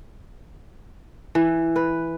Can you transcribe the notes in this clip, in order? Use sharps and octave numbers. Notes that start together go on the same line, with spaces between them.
E3
B4